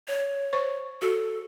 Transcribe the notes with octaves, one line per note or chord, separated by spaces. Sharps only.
C#5
C5 C#6
F#4 A4